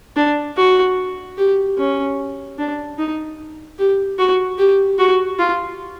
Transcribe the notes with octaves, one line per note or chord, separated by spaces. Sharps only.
D4
F#4
G4
C#4
D4
D#4
G4
F#4
G4
F#4
F4